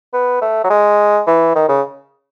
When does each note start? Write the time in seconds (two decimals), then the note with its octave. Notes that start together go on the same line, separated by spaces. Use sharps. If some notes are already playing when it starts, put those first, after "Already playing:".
0.13 B3
0.42 A3
0.64 F#3
0.70 G#3
1.27 E3
1.55 D#3
1.69 C#3